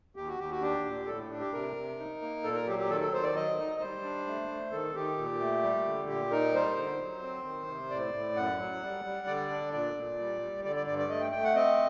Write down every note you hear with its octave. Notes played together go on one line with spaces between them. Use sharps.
D#2 G4
F#4
D#2 G4
F#4
D4 G4
A#2
A2 A4
D4
G4
C3 A#4
C3
D#4
A#3
A#2 A4
A#4
F#3 G4
G4
D#3 A4
A4
D#3 C5
D5
F#3 D#5
D#4
G3 C5
D4
A3
A3
D#3 A4
D#3 G4
A#2
A3
G3
D3
A#2 G4
D#4 A#4
G3 C5
D3
F#3
C4
D#3
C3
A2 D5
A2
F#2 F#5
F#3
G3
G3
D3 D5
D4
A#2 D5
A#2
G3
G3
D3 D5
D5
G2 D5
D5
A3 D#5
G5
A3 G5
F#5
C4 D#5